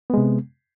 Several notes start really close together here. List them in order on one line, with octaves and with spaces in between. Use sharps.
B3 G#3 C3